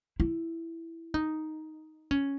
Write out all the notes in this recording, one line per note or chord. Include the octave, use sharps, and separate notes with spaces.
E4
D#4
C#4